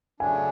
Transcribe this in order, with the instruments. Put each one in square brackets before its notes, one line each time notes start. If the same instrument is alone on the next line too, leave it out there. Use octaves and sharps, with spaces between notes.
[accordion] C#3 F#3 A3 D4 [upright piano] G#5